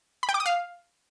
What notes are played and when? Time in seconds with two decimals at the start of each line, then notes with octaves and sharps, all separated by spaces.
0.23 B5
0.29 G5
0.34 D6
0.40 D#6
0.46 F5